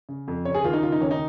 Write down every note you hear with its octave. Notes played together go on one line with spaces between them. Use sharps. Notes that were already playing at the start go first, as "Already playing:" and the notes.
C#3
F2
C#3 C#5
G#4
D#2 F4
D#4
C#3 F4
D#4
D#2 C#4
D#4